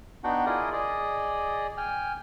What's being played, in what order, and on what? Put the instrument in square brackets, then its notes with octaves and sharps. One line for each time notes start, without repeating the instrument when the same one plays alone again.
[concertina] B3 D4 D#4 F#4 F#5 G5
E4 F4 G#4 A#4 D5 D#5
G#4 D5 D#5
G5 G#5 F6